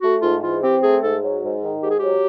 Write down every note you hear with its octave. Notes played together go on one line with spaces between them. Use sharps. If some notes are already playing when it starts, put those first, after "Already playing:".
A3 F#4
G#2 F4
E3 F4
C4 G4
A3 G#4
G#2 A4
F#3
G#2
D#3
G#2 G4
G#4
F#3 G4